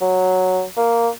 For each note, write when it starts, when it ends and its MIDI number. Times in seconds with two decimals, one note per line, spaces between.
0.01 0.63 54
0.77 1.09 58